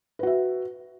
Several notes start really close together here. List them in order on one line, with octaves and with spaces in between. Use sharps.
B4 F#4 E5